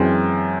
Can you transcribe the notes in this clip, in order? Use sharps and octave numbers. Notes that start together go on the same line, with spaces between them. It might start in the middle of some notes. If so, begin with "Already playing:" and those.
Already playing: F#2 E3 G#3 C4